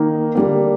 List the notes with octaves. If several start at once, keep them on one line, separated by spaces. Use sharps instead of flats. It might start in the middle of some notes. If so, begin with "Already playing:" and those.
Already playing: D#3 A#3 D#4
D3 G3 A#3